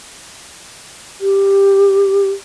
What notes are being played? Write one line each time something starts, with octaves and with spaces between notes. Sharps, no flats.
G4